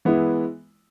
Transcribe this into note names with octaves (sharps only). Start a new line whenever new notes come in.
E3 G#3 B3 E4